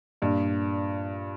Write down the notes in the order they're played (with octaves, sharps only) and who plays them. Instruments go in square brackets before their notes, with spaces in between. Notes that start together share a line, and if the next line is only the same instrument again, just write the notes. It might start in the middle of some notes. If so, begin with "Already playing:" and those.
[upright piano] G2 A#2